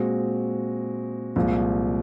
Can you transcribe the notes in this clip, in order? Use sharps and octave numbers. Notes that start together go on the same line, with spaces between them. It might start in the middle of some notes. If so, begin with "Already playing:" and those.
Already playing: A#2 G#3 C4 F#4
C2 A#2 F3 G#3